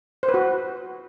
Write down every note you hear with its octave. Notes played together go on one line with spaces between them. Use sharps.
C5
B4
F#4